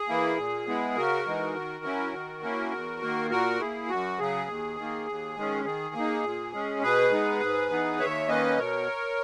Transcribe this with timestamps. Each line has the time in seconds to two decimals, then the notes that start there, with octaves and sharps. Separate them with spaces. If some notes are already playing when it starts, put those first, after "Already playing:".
Already playing: G#4
0.09 E3 A#3 E4
0.38 A#2
0.67 G#3 B3 E4
0.96 C#3 F#4 A#4
1.26 E3 G#3 D#4
1.55 D#3
1.85 F#3 C#4 E4
2.14 D#3
2.43 A#3 C#4 E4
2.72 E2
3.02 D#3 A#3
3.30 A#2 F#4 A#4
3.60 A#3 E4 G#4
3.89 F#2 F#4
4.19 C#3 F#3 G#4
4.47 D#2
4.77 D#3
4.82 A#3
5.06 D#2
5.36 D#3 G#3 C#4
5.65 D#3 G#4
5.95 A#3 D#4
6.23 A#2
6.53 G#3 C#4
6.82 B2 G#4 B4
7.11 G#3 B3 D#4
7.40 G#2
7.70 E3 B3 D#4
7.99 D#2 C#5 E5
8.28 D#3 A#3 C#4 B4 D#5
8.58 B2 A#4 C#5